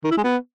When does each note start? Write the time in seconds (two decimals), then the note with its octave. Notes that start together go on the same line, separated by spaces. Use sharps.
0.04 D#3
0.11 E4
0.17 G#3
0.24 B3